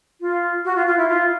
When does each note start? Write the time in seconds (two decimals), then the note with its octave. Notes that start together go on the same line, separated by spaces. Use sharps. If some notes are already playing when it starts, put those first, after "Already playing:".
0.21 F4
0.65 F#4
0.76 F4
0.86 F4
0.97 E4
1.08 F4